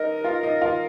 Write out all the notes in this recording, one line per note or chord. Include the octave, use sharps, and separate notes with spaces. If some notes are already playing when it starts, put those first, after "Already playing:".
Already playing: D#4 A#4 D#5
F4 F5
D#4 D#5
F4 F5